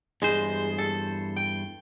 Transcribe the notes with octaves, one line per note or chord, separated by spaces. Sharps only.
E2 G2 G#3 C5
A4
G5